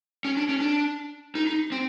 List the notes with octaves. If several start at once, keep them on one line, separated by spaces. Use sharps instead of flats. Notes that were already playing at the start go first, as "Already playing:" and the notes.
C#4
D4
C#4
D4
D#4
D#4
C4